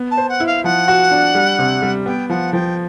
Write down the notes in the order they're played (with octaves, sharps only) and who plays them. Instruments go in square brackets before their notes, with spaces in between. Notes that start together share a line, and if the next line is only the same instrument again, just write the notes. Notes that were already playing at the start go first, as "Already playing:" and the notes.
Already playing: [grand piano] B3
[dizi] A5
[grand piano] C5
[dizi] F#5
[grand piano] E4
[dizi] F5
[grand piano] F3 [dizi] F#5
[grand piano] F#4
D4
G3
C3
G3
[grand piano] B3 [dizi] G5
[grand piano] F3 [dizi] F#5
[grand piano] F3 [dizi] G5